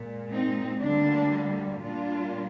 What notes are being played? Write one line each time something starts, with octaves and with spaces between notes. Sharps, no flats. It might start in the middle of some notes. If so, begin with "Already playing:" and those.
Already playing: A#2 G#3
C4 D#4
D2 D3 G3 A#3 D4
A#2 G3 A#3 D4 F4